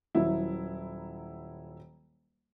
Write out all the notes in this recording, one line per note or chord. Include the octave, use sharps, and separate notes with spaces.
D#1 F#3 E4